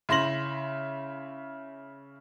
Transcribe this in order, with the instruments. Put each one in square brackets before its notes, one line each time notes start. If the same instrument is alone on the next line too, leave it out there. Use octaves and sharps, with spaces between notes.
[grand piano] C#3 E4 C6 A#6 F#7